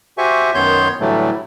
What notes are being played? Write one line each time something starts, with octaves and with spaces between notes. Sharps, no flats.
F#4 G4 C5 E5 G#5 C#6
F#2 D#3 B3 C#5 C6 G6
A2 D3 E3 F#3 G3 A3